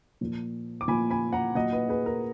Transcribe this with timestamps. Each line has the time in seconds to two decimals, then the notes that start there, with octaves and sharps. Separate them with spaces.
0.21 A#2 F3 A#3
0.81 D6
0.88 A#2 F3 A#3 G#5 B5
1.10 G#5 B5
1.33 F#5 A#5
1.55 A#2 F#3 A#3 D#5 F#5
1.72 B4 D#5
1.89 G#4 B4
2.06 A#4